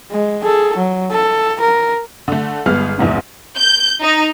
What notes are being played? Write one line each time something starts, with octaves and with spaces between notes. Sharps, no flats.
G#3
G#4 A4
F#3
A4
A#4
D3 A3
G1 G#3 B3 F6
A#1 E2 G#2 C3
G6
D#4